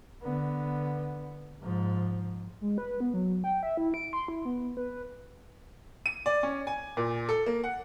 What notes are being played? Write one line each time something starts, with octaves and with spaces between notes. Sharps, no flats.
D3 B3
G#2 F3
G#3
B4
B3
F#3
G5
E5
E4
D7
C6
E4
B3
B4
D#7
D5
C#4
G#5
A#2
A4
A#3
F#5